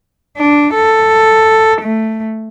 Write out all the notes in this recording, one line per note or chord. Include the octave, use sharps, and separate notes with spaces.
D4
A4
A3